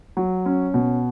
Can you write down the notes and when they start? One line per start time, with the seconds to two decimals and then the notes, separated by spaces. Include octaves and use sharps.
0.17 F#3
0.46 C#4
0.74 B2